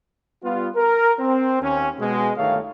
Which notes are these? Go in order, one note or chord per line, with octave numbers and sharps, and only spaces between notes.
G3 B3 F4
A#4
C4
D#2 C#4
B2 G#3
G1 D#3 A3 C#5 F5